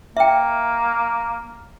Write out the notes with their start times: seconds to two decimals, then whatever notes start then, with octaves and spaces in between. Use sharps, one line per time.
0.17 A#3 E5 G5